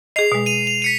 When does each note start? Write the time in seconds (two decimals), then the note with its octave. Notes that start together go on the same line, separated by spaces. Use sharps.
0.16 G#4 D#5 C7 F7
0.32 B2 G#3
0.46 D#7 F7
0.67 F7
0.82 B6 C#7 D#7